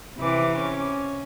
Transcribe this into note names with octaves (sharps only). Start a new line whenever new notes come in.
C3 E3 D6
C#4